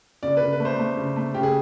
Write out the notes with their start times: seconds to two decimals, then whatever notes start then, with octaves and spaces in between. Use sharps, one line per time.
0.23 C#3 D5
0.37 C#3 B4
0.53 B4
0.60 A3
0.65 C5
0.79 A3
0.97 C#3
1.16 A3
1.34 C#3 G4
1.43 G#4